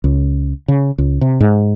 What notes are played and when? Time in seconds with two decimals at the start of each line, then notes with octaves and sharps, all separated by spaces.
0.04 C#2
0.68 C#3
0.98 C#2
1.21 C3
1.40 G#2